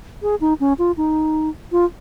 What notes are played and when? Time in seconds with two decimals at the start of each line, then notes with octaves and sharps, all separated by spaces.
0.22 G#4
0.41 D#4
0.60 C#4
0.79 F4
0.97 D#4
1.72 F4